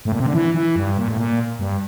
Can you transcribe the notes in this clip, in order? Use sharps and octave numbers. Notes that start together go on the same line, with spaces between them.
A2
A#2
C3
D3
E3
E3
G2
A#2
A2
A#2
G2